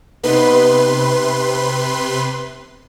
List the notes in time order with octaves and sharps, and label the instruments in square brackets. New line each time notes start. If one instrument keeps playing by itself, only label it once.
[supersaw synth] C3 B4 C6 [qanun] B3 D#4